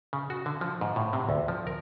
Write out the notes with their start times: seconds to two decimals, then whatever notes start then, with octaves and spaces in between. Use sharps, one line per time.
0.13 C#3
0.30 F#4
0.46 D3
0.61 F3
0.81 G#2
0.96 A2
1.13 C3
1.29 D2
1.48 F3
1.67 A#4